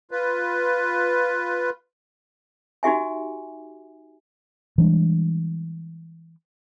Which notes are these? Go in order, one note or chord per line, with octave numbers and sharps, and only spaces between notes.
F4 B4
D#4 F#4 G4 E5 G#5
E3 G3 G#3 D4